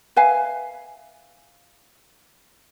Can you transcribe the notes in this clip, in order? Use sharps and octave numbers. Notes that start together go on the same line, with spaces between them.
B4 E5 F5 G#5